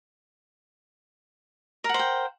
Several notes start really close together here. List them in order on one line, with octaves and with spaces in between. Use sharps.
A#4 F#5 C5 G5